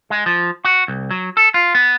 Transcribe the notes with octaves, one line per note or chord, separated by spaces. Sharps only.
G#3
F3
F#4
C2
F#3
A4
F4
B3